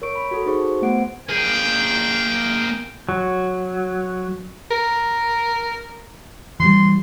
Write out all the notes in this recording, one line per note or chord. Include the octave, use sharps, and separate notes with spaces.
A#4 C#5 C#6 D7
B5
F#4 A4
D#4 F#4 G#4 C5 C#6
C5
A3 B3 F#5 D7
A#3 G#4 G5
F#3
A#4
E3 F3 G3 C6